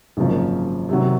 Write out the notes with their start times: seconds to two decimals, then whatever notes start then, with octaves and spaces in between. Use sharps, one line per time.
0.17 G#1 F#2 C#3 F3 A#3
0.89 C3 D#3 F#3